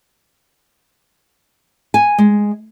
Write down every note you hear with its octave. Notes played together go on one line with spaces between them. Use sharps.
G#5
G#3